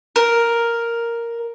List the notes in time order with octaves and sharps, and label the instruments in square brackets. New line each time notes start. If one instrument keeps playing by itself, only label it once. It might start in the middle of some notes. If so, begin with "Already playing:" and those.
[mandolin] A#4